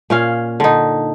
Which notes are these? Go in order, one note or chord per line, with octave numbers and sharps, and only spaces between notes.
A#2 C#4 F5
D3 D#4